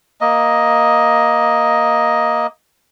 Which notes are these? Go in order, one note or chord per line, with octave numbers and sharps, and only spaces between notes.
A#3 D#5